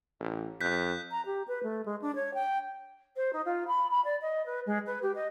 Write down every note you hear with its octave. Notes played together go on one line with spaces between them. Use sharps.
A1
F2 F#6 G6 B6
A#5
G4
B4
A3
G#3
D4
C#5
G5
C5
D#4
F4
B5
B5
D5
D#5
B4
G#3
B4
G4
D#5